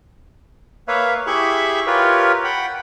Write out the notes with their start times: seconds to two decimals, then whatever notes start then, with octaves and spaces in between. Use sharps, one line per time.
0.88 A#3 B4 C#5 E5 F5
1.27 E4 G4 G#4 E5 B5 C#6
1.87 F4 G4 A#4 B4 C#5
2.45 F#5 G5 B5